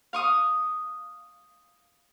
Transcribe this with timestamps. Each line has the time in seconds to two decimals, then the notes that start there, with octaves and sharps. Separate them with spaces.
0.13 F5 C#6 D#6